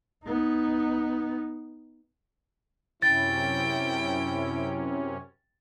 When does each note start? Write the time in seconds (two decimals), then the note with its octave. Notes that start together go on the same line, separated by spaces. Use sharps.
0.25 B3 D#4
3.02 F#2 C3 C#4 E4 G5 A6